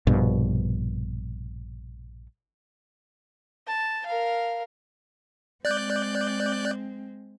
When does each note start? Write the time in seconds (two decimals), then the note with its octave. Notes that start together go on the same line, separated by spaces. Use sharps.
0.07 A#1 G2 B2
3.67 A5
4.06 A#4 F5
5.65 G#3 C4 D5 F#6 G6